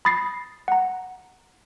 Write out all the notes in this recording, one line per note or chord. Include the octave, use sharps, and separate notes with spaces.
B5 D#6 A6 A#6 C7
F#5 A#5